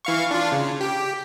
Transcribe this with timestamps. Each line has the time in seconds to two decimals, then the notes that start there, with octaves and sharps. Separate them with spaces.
0.05 E3 F5 C#6
0.31 D4 F4
0.52 C#3
0.81 G4